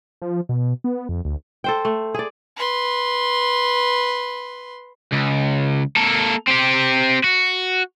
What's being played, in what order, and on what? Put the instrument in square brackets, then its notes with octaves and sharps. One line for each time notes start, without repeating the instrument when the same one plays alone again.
[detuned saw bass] F3
B2
B3
F2
D2
[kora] A4 C5 G5
A3
G#4 D5
[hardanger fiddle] B4 C6
[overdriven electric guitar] C#2
A#3 A4
C4 G4
F#4